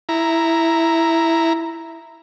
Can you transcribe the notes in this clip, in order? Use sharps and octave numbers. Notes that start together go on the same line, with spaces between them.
E4 A#5